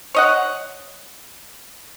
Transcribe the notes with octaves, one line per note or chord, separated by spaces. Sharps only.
C#5 D#5 F#5